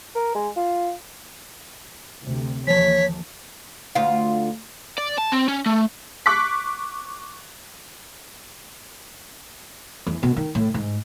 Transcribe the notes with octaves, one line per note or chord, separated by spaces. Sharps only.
A#4
G#3
F4
D2 C3
D#2 E3 F3 C#5 B6
D2 F4
D5
A5
C4
C#4
A3
C#6 D6 F#6 B6
E2
B2
D#3
A2
G#2